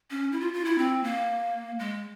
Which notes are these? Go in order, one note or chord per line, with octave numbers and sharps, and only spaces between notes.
C#4
E4
F4
F4
E4
C4
A#3
G#3